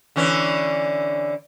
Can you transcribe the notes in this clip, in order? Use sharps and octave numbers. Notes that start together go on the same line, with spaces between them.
D3 E3 C#4